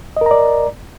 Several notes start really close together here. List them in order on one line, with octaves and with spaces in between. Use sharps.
D#5 A#4 A#5 D5